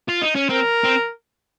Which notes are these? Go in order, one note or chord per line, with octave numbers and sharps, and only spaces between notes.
F4
D#4
C#4
C4 A#4
C4